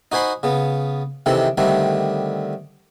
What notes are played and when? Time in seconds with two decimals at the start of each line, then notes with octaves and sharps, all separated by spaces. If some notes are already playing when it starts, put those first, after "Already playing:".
0.12 D#4 F#4 C5 G#5 B5 C6
0.43 C#3 B3
1.26 C3 D#3 E3 C4 A4
1.58 D3 D#3 G3 A3 C4